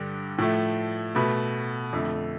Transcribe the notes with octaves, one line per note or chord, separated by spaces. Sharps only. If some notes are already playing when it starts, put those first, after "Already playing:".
Already playing: G2 D3 G3
A2 F3 A3
B2 A3 B5
F2 D3 A3